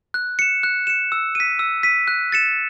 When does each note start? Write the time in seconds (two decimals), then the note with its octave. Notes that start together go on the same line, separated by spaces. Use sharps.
0.14 F#6
0.39 C#7 E7
0.63 F#6
0.87 C#7 E7
1.12 E6
1.35 B6 D#7
1.59 E6
1.83 B6 D#7
2.08 F#6
2.32 A6 C#7 E7